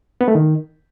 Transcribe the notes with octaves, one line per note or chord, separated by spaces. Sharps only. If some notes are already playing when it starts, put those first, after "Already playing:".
B3
A3
D#3